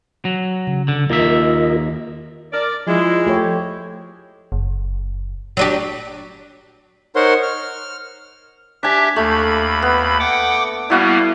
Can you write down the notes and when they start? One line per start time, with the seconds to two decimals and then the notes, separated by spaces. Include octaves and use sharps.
0.25 F#3
0.67 C#3
0.88 D3
1.10 D#2 A#3 F4 A#4 D#5 E5
2.53 A#4 D5
2.87 F3 G#3 E4
3.26 A3 G4 C#5
4.52 F#1
5.57 F#3 D4 G4
7.16 D#4 A#4 C5 C#5 F#5 C6
7.43 F6
8.83 D4 G4 E5 G#5
9.16 D#2 A3 B5
9.82 B3
10.20 F#5 G5 D6
10.90 G3 A#3 B3 E4 F#4 F5